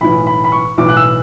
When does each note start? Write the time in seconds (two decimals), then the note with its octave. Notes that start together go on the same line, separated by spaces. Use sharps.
0.01 B1 A2 E3 B5
0.27 B5
0.44 B5
0.52 C#6
0.77 B1 A2 E3 D6
0.89 F#6
0.97 E6